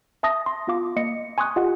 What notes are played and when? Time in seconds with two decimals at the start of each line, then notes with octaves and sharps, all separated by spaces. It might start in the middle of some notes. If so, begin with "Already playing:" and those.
0.23 E5 A5 D#6 A#6
0.46 C6
0.67 B3 F4 F5 D6
0.96 A#3 D#5 C#7
1.38 G#5 C6 C#6 D#6 F#6
1.56 F4 G4 D#5 F#5